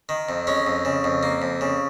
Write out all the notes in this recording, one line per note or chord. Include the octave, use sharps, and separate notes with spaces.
D#3
F2
G#3 C#4
F2
C#3
F2
A#3
F2
C#3